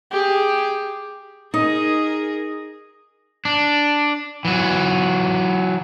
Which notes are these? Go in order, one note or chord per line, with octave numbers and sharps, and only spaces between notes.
G4 G#4
D#4 G#4 A#4 D#5
D4
E3 F#3